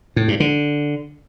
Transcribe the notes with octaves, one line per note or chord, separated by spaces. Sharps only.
A2
G2
D3